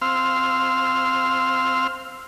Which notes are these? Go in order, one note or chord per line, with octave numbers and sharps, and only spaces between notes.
C4 F5 C6 E6 F6